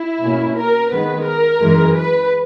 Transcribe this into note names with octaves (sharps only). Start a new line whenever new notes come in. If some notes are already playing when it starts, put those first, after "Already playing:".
Already playing: E4
B2 A#3 C#4
A#4
D#3 G#3 B3 B4
A#4
F#2 E3 G#3
B4